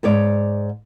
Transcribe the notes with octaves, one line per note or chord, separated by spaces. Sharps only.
G#2 C#5 D5